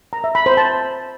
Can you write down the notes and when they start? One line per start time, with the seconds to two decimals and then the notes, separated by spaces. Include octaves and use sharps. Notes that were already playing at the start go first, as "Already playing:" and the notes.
0.13 A#5
0.24 E5
0.35 B5
0.46 C5
0.57 A5